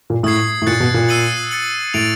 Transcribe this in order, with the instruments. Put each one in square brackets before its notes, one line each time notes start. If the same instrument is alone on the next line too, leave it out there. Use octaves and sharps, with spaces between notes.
[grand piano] A#2
[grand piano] A2 [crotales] D#6 G#6 C7
[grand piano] A2
[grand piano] A#2 [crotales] F#6 A6 C#7
[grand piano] B2
A#2
[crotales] E6 A6 C7 D#7 F#7
A6 C#7 F#7
[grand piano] A2 [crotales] A6 D7 F7